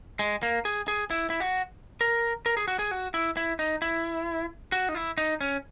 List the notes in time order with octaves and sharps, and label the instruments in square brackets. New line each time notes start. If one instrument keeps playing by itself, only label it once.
[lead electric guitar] G#3
A#3
G#4
G#4
E4
E4
F#4
A#4
A#4
G#4
F#4
G#4
F#4
E4
E4
D#4
E4
F#4
D#4
E4
D#4
C#4